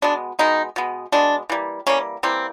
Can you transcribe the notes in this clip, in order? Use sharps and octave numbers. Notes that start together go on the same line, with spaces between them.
B2 G#3 B3 D4
B2 G#3 B3 D#4
B2 G#3 B3
B2 G#3 B3 D4
E3 G3 A#3
E3 G3 A#3 C#4
E3 G3 A#3 C4